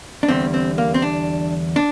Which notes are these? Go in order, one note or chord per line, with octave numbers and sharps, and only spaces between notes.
D4
E2 D3 G3 C4
C4
A#3
C4
D4
D4